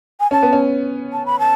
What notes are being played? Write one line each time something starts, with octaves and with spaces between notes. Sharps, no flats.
G#5
C#4 A5
B3
C#4
A5
B5
A5